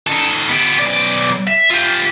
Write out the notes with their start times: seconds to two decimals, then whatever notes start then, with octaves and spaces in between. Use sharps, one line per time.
0.07 D#3 A4
0.50 B3 G4
0.79 B1 D5
1.47 E5
1.70 F4 G4